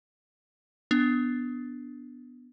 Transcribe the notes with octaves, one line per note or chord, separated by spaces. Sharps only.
B3 D4